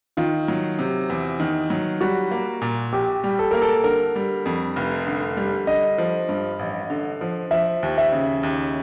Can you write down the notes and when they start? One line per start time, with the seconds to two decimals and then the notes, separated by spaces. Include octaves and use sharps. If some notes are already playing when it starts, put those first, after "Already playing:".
0.17 D#3 F4
0.48 F#3
0.79 C3
1.10 E2
1.40 D#3
1.70 F#3
2.01 G3 F#4
2.31 A#3
2.62 A#2
2.92 A#1 G4
3.24 G3
3.39 A4
3.51 A#3 A#4
3.62 A4
3.84 D3 A#4
4.16 G3
4.46 F2
4.76 F1
5.07 D3
5.37 G3
5.67 D3 D#5
5.98 F3
6.29 G2
6.59 A1
6.90 D3
7.21 F3
7.51 F3 E5
7.83 D#2
7.98 E5
8.12 C#3
8.43 D#2